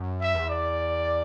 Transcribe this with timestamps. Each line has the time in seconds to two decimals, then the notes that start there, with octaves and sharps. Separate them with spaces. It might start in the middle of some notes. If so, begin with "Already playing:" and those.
Already playing: F#2
0.21 E5
0.35 E2
0.49 D5